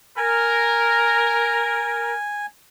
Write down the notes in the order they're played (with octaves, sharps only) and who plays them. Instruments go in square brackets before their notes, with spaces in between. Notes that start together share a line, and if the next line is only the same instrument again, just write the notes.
[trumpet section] A#4 [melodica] G#5